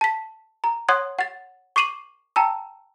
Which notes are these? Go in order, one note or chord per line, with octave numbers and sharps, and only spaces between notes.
A5 B6
A#5
C#5 F#5 C6 D#6 F#6 G#6
F#5 A6
C#6 D6 C7 D#7 E7 F#7
G5 A5 A#5 E6